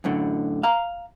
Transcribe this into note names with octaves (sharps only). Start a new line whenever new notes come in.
F#2 A2 D3
F5 A#5